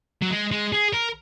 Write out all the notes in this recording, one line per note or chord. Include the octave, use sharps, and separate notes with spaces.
F#3
G#3
G#3
G#4
A#4